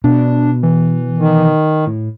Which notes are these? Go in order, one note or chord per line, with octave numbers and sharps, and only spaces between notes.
B2 D4
E3
D#3
A2